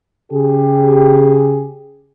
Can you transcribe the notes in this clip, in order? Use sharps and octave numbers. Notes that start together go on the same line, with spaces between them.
C#3 G4 G#4